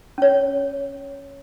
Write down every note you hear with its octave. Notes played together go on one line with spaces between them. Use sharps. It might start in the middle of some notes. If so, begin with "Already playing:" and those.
C#4 C#5